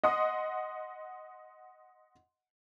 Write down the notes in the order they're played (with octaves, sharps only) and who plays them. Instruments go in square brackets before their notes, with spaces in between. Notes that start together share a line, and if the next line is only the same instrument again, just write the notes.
[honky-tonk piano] D#5 F#5 C6 D#6